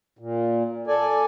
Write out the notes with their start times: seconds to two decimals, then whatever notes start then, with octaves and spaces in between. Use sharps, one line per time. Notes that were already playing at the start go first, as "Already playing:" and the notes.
0.19 A#2
0.87 A4 D5 G#5